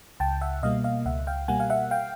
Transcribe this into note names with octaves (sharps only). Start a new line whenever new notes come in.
C#2 G5 A5
E5 F#5
B2 G3 A#3 D#5 F5
D#5 F5
C#2 E5 F#5
F5 G5
B2 G3 A#3 F#5 G#5
F5
E5 F#5
F5 G5